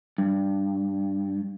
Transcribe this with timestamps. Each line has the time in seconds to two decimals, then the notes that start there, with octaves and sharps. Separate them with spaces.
0.18 G2